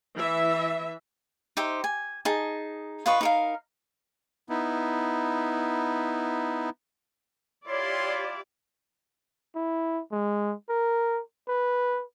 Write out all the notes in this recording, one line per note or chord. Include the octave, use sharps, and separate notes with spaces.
E3 E5
D#4 G4 C5 E5
G#5
D#4 G#4 A5
F4 B4 D#5 C#6
D#4 A#4 F5
B3 D#4 E4
E4 F4 G4 C#5 D5 C6
E4
G#3
A#4
B4